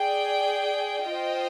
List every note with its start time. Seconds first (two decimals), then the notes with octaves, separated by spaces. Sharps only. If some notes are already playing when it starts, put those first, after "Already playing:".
Already playing: G#4 D5 G5
1.06 F4 C5 D#5 G5